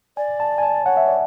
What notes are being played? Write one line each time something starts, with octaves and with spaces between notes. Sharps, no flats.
D5 G#5
A5
G#5
A5
C#5 F#5
E5
D5